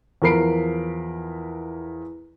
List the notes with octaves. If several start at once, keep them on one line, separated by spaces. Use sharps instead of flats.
E2 F3 A#4 B5 C7 D7